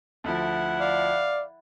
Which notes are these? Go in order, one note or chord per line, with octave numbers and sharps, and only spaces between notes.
D2 F3 E4 F#5
D5 F5